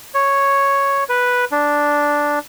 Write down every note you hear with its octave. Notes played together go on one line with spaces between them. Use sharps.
C#5
B4
D4